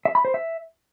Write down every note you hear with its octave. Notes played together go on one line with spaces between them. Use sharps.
E5
B5
C5
E5